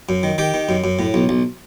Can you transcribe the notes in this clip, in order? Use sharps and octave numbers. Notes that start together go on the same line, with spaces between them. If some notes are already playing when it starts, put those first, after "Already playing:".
F#2
D#3
D#3 G4
D#3
F#2
F#2
A2
B1
B1